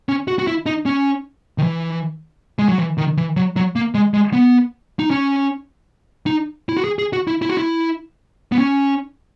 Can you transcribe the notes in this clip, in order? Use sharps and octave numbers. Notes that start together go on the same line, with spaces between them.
C#4
F#4
F#4
E4
D#4
C#4
D#3
E3
G#3
F#3
E3
D#3
E3
F#3
F#3
A#3
G#3
G#3
B3
D#4
C#4
D#4
E4
F#4
G#4
G#4
F#4
E4
E4
F#4
E4
B3
C#4